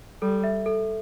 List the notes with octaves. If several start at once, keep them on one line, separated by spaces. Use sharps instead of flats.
G3 A4
E5
A4